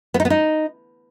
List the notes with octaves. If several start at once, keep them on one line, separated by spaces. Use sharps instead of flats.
B3
D#4
B3
D#4